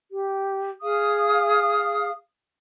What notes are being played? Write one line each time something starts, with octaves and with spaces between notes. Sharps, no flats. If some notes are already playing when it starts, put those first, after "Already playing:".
G4
G#4 F5 D#6